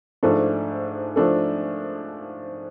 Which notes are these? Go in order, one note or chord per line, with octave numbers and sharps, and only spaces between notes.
G#2 F3 A3 D4 A4
F3 A3 D4 A4